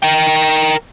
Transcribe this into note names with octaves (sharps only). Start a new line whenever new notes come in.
A#4 G5